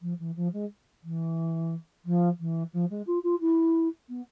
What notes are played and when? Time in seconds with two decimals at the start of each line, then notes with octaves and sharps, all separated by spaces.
0.01 F3
0.19 E3
0.36 F3
0.53 G#3
1.03 E3
2.05 F3
2.39 E3
2.73 F3
2.90 G#3
3.07 F4
3.23 F4
3.40 E4
4.09 B3